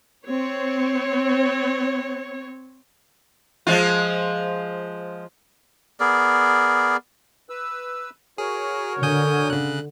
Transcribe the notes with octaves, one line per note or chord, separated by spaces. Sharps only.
C4 C#5
F3 G#3 F4
B3 G#4 A#4 D5
B4 E6
F#4 G#4 A#4 C#5
D3 G#5 D#6 G6
C#3 F#6